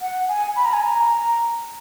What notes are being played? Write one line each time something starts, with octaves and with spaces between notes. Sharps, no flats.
F#5
G#5
B5
A#5
G#5
A#5